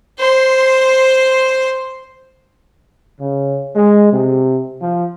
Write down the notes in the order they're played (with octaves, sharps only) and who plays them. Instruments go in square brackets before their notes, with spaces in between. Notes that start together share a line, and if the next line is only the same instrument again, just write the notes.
[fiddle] C5 C6
[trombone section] C#3
G#3
C3
F3